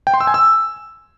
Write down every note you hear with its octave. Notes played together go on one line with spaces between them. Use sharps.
G5
C6
E6
G#5
E6